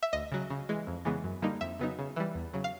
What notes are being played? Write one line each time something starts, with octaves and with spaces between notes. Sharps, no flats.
E5
D2 D#5
C#3 F#3
C#3
E3 G#3
F2
C#3 E3 G#3 B3
F#2
D3 G3 A#3 D#4
F2 E5
C#3 F#3 B3 D#4
C#3
E3 G3
E2
C#3 F#3
F5